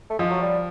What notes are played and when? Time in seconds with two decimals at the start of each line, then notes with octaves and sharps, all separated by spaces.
0.10 A3
0.19 F3 G#3
0.30 F#3
0.41 G3